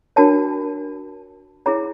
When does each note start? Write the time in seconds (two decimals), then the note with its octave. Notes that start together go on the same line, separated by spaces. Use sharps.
0.16 D4 F#4 A#4 C#5 A5
1.66 E4 G#4 C#5 A#5